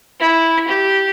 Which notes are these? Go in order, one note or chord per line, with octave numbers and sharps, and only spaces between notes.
E4
G4